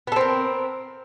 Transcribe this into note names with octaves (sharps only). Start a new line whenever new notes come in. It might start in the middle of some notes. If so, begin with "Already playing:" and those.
B3 C4 A4 A#4